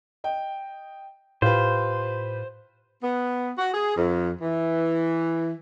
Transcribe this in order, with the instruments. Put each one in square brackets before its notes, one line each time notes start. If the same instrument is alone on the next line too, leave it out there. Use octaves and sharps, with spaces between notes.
[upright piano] D#5 G5
[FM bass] A2 [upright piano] F4 G4 B4 [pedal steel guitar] C5
[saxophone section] B3
F#4
G#4
F2
E3